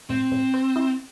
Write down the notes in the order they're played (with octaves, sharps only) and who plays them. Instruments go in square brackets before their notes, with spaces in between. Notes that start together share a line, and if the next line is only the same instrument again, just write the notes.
[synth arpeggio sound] A2 [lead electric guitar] C4
[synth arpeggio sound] A2
C5
E4